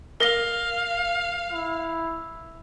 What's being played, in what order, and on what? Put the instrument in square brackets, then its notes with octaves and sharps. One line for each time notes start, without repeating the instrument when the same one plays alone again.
[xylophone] A#4 A#6 G7 [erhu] F5
[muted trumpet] E4